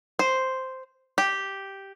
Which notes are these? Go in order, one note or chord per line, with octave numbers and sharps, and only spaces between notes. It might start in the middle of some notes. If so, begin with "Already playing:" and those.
C5
G4